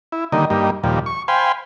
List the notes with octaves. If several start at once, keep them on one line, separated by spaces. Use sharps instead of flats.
E4
D3 D#3 G3 A#3 D#4
G2 G3 A#3 D#4
D#2 A#2 F3 G3
C#6
C5 F5 G5 G#5 B5 C6